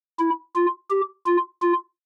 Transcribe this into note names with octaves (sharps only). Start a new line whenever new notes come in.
E4
F4
G4
F4
F4